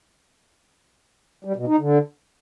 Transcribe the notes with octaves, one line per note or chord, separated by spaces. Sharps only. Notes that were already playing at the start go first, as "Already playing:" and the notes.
G3
B2
D#4
D3